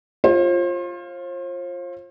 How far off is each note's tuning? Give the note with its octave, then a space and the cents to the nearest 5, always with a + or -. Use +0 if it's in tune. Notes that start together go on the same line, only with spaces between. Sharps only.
F4 +0 C5 +40